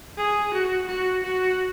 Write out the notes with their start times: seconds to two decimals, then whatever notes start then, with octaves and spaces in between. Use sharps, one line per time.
0.17 G#4
0.53 F#4
0.88 F#4
1.23 F#4